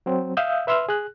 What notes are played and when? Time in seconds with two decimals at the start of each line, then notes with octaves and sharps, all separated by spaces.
0.06 F#3 C4
0.37 E5 F5 D#6 E6 G6
0.67 B4 E5 C6 E6 F6
0.89 G#4 F#6